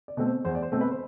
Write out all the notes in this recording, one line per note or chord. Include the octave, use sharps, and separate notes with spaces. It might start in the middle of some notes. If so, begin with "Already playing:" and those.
D5
B2 A3 C4
C5
E2 C5
D5
C5
B2 A3 C4
B4
C5